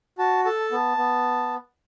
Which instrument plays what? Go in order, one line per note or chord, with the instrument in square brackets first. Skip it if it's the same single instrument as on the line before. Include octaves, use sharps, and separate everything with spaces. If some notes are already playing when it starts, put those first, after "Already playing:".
[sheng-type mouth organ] F#4 A5
A4 A5
B3
B3